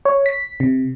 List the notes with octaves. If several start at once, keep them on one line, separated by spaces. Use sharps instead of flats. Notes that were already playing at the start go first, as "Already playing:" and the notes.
C#5
B6
C3